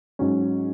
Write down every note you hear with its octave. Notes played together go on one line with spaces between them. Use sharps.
G#2 F#3 C#4